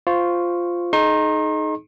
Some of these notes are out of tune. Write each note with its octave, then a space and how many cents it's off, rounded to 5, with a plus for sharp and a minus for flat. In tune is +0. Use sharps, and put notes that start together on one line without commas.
F4 +0 C5 -10 C#6 +0
D#4 +0 G#4 +40 C6 +45